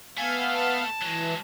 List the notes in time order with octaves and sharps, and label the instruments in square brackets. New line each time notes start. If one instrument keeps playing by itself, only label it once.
[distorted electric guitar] A3 A4 [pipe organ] B3 F5 [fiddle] G#5
[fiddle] A5
[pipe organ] E3 [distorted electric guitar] F#3 G#3